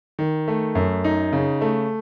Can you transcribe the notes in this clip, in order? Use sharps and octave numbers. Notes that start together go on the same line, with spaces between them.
D#3
A3
F#2
D#4
C#3
A3